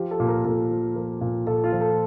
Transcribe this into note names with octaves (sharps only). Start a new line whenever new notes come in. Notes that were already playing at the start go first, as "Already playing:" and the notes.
Already playing: F3 G4
A4
A#2
A#4
A#2 A4
F3
F3 A#4
A#2
A#2 A4
F4
F3
A4